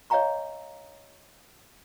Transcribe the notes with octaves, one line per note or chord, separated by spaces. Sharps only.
C#5 D#5 F5 G5 A#5 C#6